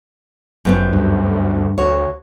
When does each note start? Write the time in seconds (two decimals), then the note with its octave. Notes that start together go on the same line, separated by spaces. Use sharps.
0.65 G1 F#2 B3 C4
0.93 D2 G2
1.78 D2 F#4 C#5